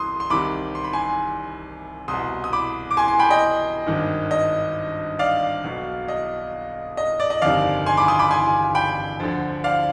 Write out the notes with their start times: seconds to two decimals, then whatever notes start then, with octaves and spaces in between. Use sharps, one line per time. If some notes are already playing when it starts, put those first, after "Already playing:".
Already playing: C2 C6 D#6
0.20 C6
0.30 C2 C3 D#3 B5 D6
0.75 C6
0.84 B5
0.93 G#5 C6
2.08 C2 B2 C6 D#6
2.44 D#6
2.53 B5 D6
2.91 D6
2.97 G#5 C6
3.08 G#5 C6
3.19 G5 B5
3.30 D#5 G5
3.87 G#1 G2 D#3
4.31 D#5
5.19 D5 F5
5.64 B1 B2
6.08 D#5
6.97 D#5
7.20 D5
7.30 D#5
7.42 G1 F2 C3 D#3 D5 F5
7.86 G#5 C6
7.97 B5 D6
8.08 C6 D#6
8.19 B5 D6
8.31 G#5 C6
8.75 G5 B5
9.20 D2 D3 F3
9.64 D5 F5